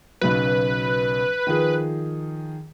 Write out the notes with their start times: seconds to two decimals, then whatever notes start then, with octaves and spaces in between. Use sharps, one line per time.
0.21 B1 C#3 F#3 B4
1.47 D#3 F3 G#4